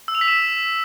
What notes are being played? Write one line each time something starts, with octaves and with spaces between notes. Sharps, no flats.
E6
F7
B6
E7